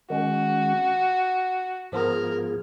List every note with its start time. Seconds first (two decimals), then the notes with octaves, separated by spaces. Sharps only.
0.10 D#3 G#3 C#4 F#4
1.92 G#2 F3 B3 F4 G#4 A#4